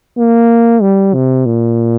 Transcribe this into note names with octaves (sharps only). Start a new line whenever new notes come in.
A#3
G3
C3
A#2